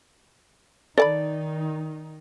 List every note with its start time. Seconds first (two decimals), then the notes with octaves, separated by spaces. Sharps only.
0.98 D#3 D#4 A4 D5 A5 B5